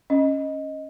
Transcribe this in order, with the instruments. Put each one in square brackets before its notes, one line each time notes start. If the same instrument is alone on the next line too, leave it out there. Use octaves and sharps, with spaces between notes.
[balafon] C#4 [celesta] D#5